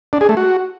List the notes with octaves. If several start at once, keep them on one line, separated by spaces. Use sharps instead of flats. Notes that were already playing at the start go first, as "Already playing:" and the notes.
D4
G#4
A3
F#4